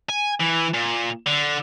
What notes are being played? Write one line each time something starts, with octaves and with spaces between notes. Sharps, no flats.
G#5
E3
A#2
D3